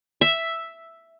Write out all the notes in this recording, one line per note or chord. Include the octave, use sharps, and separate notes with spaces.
E5